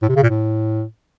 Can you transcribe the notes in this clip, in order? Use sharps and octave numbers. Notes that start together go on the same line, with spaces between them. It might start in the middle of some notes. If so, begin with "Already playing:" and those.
A2
C3
C#3
A#2
A2